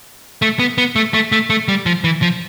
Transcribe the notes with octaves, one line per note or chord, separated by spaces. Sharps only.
A3
B3
B3
A3
A3
A3
A3
G3
F3
E3
F3